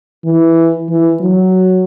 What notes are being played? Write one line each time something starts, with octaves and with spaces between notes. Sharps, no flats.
E3
E3
F#3